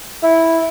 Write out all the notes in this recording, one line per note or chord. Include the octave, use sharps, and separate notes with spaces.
E4